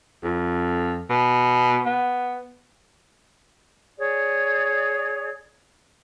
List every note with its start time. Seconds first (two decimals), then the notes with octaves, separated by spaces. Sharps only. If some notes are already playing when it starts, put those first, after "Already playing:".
0.24 F2
1.10 B2
1.86 B3
3.98 G#4 C#5 D5